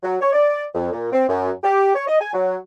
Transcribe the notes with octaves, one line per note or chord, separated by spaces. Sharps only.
F#3
C#5
D5
F2
A#2
C4
F#2
G4
C#5
D#5
G#5
F#3